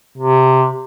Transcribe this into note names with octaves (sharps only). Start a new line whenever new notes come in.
C3